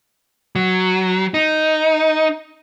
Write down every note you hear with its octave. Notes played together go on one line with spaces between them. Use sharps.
F#3
D#4